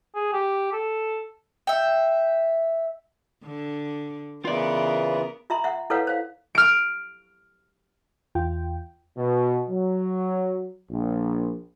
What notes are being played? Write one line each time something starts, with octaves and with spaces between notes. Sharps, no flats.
G#4
G4
A4
E5 G5
D3
C#3 E3 B3 F4 A#4 B4 D5
F4 E5 A#5 C6
E5 F#5
E4 A4 B4 C#5 F5 F#5
C5 F5
F6 D7
E2 F4 G5
B2
F#3
A#1